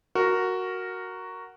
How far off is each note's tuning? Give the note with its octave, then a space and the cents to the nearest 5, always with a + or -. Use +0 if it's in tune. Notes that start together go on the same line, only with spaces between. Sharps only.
F#4 +0 A#4 -5